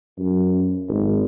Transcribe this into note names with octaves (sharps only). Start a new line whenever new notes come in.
F#2
G#1